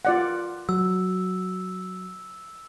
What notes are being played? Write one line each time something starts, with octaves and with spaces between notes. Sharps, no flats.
F4 D5 F#5
F#3 E6